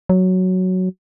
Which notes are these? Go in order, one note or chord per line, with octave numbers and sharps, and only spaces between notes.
F#3